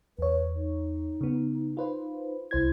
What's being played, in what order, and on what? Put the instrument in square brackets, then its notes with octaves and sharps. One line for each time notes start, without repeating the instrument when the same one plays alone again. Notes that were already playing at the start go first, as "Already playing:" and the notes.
[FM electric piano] E2 C#5 [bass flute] B4
[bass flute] D#4
[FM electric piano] C#3 B3
F4 B4 C5
[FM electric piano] C2 C5 G#6 [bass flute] E4